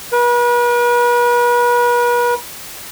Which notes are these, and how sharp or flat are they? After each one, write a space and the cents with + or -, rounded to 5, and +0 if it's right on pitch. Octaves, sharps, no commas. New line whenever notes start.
B4 -40